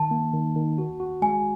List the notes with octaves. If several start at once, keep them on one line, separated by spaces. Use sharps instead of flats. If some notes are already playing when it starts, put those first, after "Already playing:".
Already playing: D#3 A5
A#3
D#3
D#3
F#4
F#4
G#3 G#5